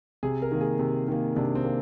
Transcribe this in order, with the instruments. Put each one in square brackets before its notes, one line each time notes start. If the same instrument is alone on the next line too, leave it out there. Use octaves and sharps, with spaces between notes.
[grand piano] C3 G#4
A#4
D#3 A#3
G#4
C3
D#3 A#3
C3 D4
C4
A#3